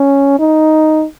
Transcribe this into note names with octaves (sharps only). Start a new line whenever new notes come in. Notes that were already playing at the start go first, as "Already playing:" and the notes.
Already playing: C#4
D#4